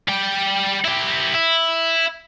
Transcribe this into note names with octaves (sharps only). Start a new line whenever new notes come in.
G3 G5
E4 G4
E4